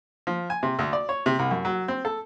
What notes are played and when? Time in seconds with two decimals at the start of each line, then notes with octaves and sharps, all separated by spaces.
0.27 F3
0.50 G#5
0.63 C3
0.79 D2
0.93 D5
1.09 C#5
1.26 C3
1.39 C2
1.51 F#2
1.65 F#3
1.88 C4
2.05 A4